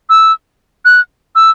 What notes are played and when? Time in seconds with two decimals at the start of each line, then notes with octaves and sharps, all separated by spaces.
0.10 E6
0.85 F#6
1.35 E6